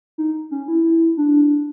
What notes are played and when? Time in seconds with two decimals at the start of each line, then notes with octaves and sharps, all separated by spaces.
0.18 D#4
0.51 C#4
0.68 E4
0.84 E4
1.17 D4